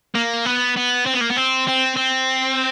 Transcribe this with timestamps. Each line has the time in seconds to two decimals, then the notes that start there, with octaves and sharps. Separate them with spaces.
0.15 A#3
0.45 B3
0.76 B3
1.06 C4
1.14 B3
1.20 A#3
1.29 B3
1.36 C4
1.67 C4
1.97 C4